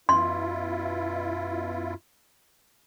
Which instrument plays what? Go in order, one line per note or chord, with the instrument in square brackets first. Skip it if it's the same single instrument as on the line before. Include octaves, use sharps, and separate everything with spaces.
[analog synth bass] F#2 [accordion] B2 E4 F4 [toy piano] C6